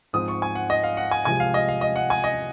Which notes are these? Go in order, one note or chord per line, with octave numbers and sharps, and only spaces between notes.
G#2 F3 C4 D#6
C#6
G#5
F#5
D#5
F5
F#5
G#5
C2 C3 F3 G#3 G#5
F5
D#5
F5
D#5
F#5
G#5
D#5